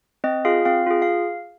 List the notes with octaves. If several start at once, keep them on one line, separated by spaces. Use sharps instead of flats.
C4 D#5
F4 G#4 F5
C4 F5
F4 G#4
F5